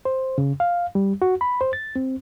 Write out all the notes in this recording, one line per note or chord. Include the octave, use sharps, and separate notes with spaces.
C5
C#3
F5
G3
F#4
B5
C5
A6
C4